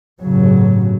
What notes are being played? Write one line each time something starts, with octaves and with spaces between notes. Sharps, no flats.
G1 A2 C#3 F#3